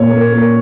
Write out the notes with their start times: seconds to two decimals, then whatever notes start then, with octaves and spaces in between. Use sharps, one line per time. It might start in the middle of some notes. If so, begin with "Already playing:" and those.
Already playing: A#2 A#3 C#5
0.11 A#3
0.32 A#3